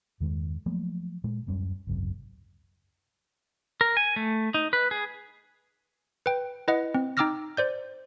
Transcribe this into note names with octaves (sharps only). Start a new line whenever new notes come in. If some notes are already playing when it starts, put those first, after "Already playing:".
E2 G2 D#3 G#3
F3 F#3 A3 A#3
A#2 G#3
D1 F#2 G3 C#4
G#1 C#2 F#2 C3
A#4
G#5
A3
D#4
B4
G#4
B4 G5
E4 B4 D#5 F#5
C4
D#4 G5 D6 E6 F6 A#6
C5 D5 G6